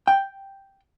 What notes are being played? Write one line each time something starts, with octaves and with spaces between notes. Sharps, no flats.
G5